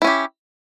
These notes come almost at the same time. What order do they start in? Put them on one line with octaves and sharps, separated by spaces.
E4 C#4 G4